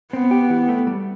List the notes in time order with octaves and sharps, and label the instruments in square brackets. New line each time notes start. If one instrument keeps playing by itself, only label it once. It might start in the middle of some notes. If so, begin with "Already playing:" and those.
[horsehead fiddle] B3 [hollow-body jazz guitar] C4
[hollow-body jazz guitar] G4
E3
A3
G3